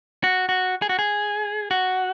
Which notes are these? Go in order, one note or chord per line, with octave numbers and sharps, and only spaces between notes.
F#4
F#4
G#4
F#4
G#4
F#4